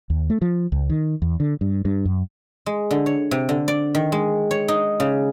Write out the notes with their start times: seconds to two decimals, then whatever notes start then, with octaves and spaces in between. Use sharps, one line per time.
0.10 D#2
0.30 A3
0.42 F3
0.72 C#2
0.90 D#3
1.22 E2
1.40 D3
1.61 G2
1.85 G2
2.06 F#2
2.66 G#3
2.91 D3
3.06 C#5
3.31 C3
3.49 D3
3.68 D5
3.95 D#3
4.12 G#3
4.51 C#5
4.68 D#4
5.00 C#3